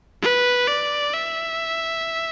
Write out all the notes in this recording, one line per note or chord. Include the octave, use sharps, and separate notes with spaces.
B4
D5
E5